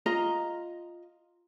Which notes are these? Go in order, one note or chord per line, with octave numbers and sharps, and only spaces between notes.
F4 D#5 A#5